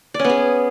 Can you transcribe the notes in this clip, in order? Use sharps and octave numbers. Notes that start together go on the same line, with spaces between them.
D5
C#4
B3
G#4